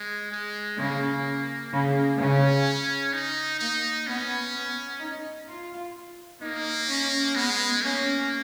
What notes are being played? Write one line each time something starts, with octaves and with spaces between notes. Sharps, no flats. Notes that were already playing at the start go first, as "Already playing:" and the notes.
Already playing: G#3
G#3
C#3 A#3
C#3
C#3 C#4
D#4
A#3 D#4
B3 C#4
B3
D#4
F4
A#3 D#4
C#4
G#3 B3
A#3 C#4